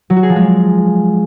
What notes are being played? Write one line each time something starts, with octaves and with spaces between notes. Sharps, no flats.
F#3
F#4
G#4
F3
G#3